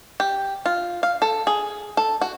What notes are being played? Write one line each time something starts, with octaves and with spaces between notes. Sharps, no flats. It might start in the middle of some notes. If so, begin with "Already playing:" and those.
G4
F4
F5
A4
G#4
A4
F#4